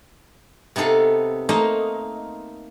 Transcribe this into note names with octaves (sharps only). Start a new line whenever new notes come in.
C3 B3 D#4 A4 F5
A3 A#3 D#4 C5 D#5